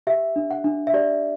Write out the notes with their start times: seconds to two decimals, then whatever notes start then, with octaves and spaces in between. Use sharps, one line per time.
0.07 G4 E5
0.36 D4
0.51 F#5
0.64 D4
0.87 E5
0.94 G4 D5